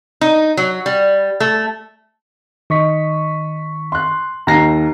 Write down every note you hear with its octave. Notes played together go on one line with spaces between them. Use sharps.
D#4
F#3
G3
A3
D#3 D#5 C#6 B6
C6 F#6
D#2 A#5 A#6 C7